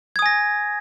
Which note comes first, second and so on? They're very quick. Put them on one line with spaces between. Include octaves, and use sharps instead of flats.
G#6 D#6 G#5 A#6